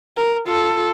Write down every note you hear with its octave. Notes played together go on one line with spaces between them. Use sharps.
A#4
F4 A4